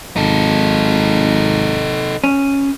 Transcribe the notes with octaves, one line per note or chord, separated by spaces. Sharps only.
G#1 D#4 A4
C#4